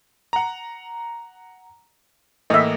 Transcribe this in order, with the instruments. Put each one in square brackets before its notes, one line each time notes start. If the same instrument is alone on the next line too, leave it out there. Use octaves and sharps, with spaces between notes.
[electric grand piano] F#5 A#5
[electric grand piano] A2 E3 A#3 [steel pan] D#5 E5